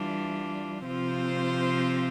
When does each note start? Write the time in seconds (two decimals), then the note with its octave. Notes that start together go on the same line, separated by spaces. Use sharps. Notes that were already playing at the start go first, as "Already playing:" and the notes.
Already playing: E3 G3 D4 F4
0.86 C3 F3 C4 F4 C5